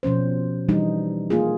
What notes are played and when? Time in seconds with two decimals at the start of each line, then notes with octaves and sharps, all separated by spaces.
0.03 B2 F3 C#4 C5
0.69 E3 G3 D4 D#4
1.30 A#3 F4 G#4